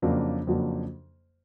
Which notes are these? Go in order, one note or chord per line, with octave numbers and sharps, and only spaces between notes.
F2 C#3 F#3 A#3 D4
F2 C#3 F#3 A#3 D4